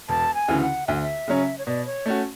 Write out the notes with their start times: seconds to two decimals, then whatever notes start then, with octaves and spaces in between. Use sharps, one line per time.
0.09 E1 A5
0.35 G#5
0.48 D2 C#3 E3
0.61 F#5
0.87 D2 E5
0.95 F#5
1.02 E5
1.28 C#3 F#3 C#4
1.58 C#5
1.67 B2 D5
1.86 C#5
2.06 A3 C#4 F#4